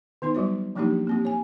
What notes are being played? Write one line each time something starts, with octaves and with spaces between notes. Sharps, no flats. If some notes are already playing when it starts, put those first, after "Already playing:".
D#3 B3 D#4 C6
F#3 G3 F#4 C#5
F3 F#3 A#3 D4 D#4 G4
A#3 C4 G4
C#5 G#5